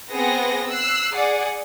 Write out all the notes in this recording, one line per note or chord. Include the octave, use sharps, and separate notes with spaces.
B3 C4 G#4 F#5 A#6
E6 F#6 C7
G#4 D5 F#5